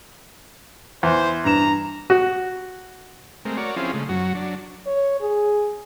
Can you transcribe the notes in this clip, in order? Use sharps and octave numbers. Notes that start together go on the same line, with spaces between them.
E2 C5
G2 A#5 E7
F#4
G#3 A3 C4 A#4
F#4 A#4 C#5 D5
F3 C4 C#4 E4 F4 G#4
C#3 G#3 A3
F#2 F#3 F#4
F#3 D4
C#5
G#4